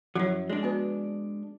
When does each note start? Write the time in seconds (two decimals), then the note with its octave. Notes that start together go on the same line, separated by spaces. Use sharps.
0.15 F#2 F3 F#3 E4 C#5
0.50 G#3 D4 D5
0.63 B3 F#4 B4